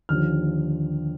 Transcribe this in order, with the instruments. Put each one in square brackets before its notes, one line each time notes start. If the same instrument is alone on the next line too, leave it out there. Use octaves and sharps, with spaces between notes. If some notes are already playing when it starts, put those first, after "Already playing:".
[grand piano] D#2 D3 F3 F6